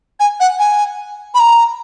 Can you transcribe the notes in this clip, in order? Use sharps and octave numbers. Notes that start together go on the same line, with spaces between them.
G#5
F#5
G#5
B5
A#5